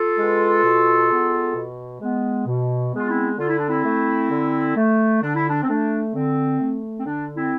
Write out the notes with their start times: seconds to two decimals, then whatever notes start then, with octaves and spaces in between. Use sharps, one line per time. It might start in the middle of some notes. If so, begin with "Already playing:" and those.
Already playing: F4 A4
0.17 G#3 B3
0.63 B2
1.09 G#3 B3
1.55 B2
2.00 G#3 B3
2.47 B2
2.93 G#3 B3 F4
3.08 C4 E4
3.39 D3 F4
3.49 E4
3.59 D4
3.68 C4 E4
3.84 A3
4.30 D3
4.76 A3
5.22 D3 D4
5.36 E4
5.49 D4
5.63 C4
5.69 A3 D4
6.14 D3 C4
6.60 A3
6.99 C4
7.06 D3 D4
7.36 C4 E4